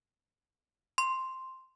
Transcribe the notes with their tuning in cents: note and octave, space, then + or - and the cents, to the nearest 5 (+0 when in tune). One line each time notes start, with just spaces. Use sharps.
C6 +0